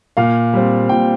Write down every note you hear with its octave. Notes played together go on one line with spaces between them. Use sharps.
A#2 F5
G3 C4
A#2 G5